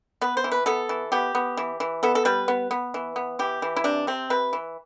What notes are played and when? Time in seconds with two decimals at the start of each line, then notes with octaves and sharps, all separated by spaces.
0.21 B3 B4
0.37 C5
0.44 E3
0.51 B4
0.66 B3 A4
0.89 E3
1.12 B3 G4
1.35 B3
1.57 E3
1.80 E3
2.03 B3 A4
2.15 A4
2.25 G3 B4
2.48 B3
2.71 B3
2.94 E3
3.16 B3
3.39 E3 G4
3.62 E3
3.76 E4
3.84 C3 D4
4.07 C3 C4
4.30 C3 B4
4.53 E3